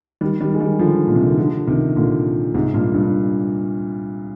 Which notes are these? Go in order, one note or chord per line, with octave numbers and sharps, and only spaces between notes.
D#3 G3
D#3 G3
G#3
D#3 G3
D3 F3
A#2
C3
D3
D#3
D3 F3
C3 D#3
A#2 D3
G#2 C3
G2 A#2
G2